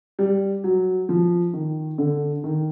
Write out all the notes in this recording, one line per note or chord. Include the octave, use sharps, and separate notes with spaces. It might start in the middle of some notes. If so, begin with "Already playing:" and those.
G3
F#3
F3
D#3
D3
D#3